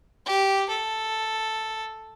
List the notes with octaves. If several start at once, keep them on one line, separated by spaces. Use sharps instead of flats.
G4
A4